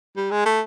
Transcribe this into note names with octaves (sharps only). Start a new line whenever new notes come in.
G3
G#3
A3